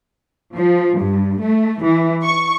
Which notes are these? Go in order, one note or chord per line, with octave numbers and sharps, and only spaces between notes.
F3
G2
A3
E3
C#6